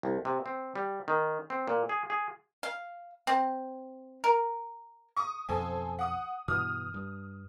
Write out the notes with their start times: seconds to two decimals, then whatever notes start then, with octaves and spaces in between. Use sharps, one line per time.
0.03 C2
0.25 C3
0.46 C4
0.75 G3
1.08 D#3
1.50 C4
1.67 A#2
1.89 G#4
2.10 G#4
2.63 F5
3.27 C4
4.24 A#4
5.16 C#6 D#6
5.49 B1 F2 A4 C5 G#5
5.99 F#5 D#6
6.48 G2 B2 E3 D#6 F6
6.94 G2